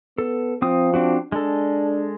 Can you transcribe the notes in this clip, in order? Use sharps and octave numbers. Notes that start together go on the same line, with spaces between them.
B3 A4
F3 C4 D#6
C4 D4 F#4
G#3 D4 A4